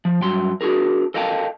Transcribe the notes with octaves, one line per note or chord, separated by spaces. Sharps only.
F3
G2 F#3 C6
D4 F#4 G#4 A#4
A4 A#4 D#5 F5 G5 A5